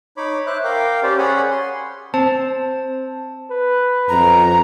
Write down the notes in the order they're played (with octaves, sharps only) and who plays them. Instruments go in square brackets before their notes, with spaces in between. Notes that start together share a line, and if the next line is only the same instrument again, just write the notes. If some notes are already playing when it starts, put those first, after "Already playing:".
[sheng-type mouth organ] D#4 C#5 B5 D6
C5 E5 D6 F#6
A#4 F5 G5 D6
C#4 G4 C5 D5
C#4 G#4 C#5 F#5 G#5 B5
C6
[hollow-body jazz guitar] C4 [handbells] C5 A5
[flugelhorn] B4
[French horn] F2 [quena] A#5